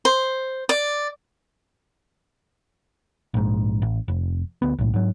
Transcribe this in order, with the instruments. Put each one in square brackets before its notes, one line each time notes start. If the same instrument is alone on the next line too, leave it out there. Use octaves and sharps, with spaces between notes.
[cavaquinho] C5
D5
[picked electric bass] A#1 G#2
A1
F1
D2 B3
B1 A2
G#2 F#3